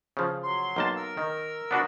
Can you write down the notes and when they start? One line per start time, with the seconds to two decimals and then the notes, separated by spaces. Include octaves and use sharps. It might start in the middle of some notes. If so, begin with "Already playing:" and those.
0.17 C#3 F3
0.43 F#3 C6
0.76 B1 A#3 A5
0.96 A#4 E6
1.17 D#3
1.71 B3 D4 F#4